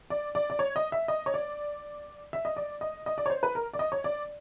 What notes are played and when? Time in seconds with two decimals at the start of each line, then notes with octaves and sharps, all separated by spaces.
0.10 D5
0.35 D5
0.50 D5
0.59 C#5
0.76 D#5
0.92 E5
1.08 D#5
1.26 C#5
1.34 D5
2.33 E5
2.45 D#5
2.57 D5
2.81 D#5
3.06 D#5
3.18 D5
3.26 C#5
3.30 C5
3.43 B4
3.55 A#4
3.73 D5
3.79 D#5
3.92 C#5
4.04 D5